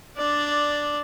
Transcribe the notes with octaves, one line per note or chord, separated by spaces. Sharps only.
D4 D5